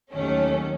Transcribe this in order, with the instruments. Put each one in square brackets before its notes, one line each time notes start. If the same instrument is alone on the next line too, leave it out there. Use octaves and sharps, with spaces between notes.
[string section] D#2 D#3 F#3 A3 C#4